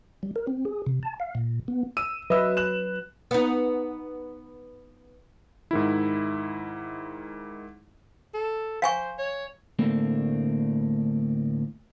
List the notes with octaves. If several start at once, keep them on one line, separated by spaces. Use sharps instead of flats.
G3
A#4
C4
G#4
C3
A5
F5
A#2
B3
E6 D#7
F#3 B4 D#5 E5 E6
F#6 E7
B3 D#4
G#2 D#3 E4
A4
C5 F5 G#5 C#6
C#5
D2 A2 A3 A#3 C4 D4